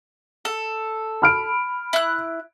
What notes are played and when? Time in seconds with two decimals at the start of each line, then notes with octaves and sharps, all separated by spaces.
0.45 A4
1.22 B5 F6 D7
1.93 E4 F#6